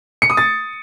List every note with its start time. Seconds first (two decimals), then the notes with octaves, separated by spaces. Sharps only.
0.22 C#7
0.30 D#6
0.37 A6